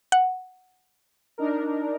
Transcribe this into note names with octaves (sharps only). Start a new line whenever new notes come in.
F#5
D4 D#4 A#4